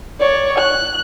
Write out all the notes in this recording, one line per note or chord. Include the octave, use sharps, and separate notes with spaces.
C#5 D5
F#6